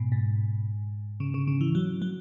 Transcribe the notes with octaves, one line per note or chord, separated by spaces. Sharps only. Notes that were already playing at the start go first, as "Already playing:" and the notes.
Already playing: G#2 B2
G#2
C#3
C#3
C#3
E3
F#3
F#3